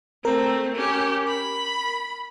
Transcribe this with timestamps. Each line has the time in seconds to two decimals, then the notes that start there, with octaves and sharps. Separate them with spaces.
0.25 A3 C4 A#4
0.75 C#4 G4
1.28 B5